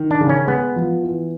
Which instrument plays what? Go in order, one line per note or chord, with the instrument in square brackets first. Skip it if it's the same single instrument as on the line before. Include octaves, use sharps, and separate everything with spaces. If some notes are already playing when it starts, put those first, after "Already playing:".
Already playing: [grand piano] D#3
[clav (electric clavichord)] D4
[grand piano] C#3
[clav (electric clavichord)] C#4
[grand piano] G#3 [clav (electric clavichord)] B3
[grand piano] F3
E3